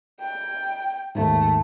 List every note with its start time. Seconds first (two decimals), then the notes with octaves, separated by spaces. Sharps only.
0.21 G5
1.15 D#2 G#2 A3